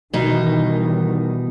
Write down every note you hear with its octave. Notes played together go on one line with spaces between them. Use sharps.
B2 D#3 E3 G3 D#4